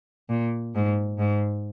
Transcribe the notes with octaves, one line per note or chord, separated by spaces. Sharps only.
A#2
G#2
G#2